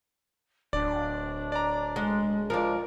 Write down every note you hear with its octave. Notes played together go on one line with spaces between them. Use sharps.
D1 D4 D5
D5 A#5
G#3
F3 G#3 A#4 D5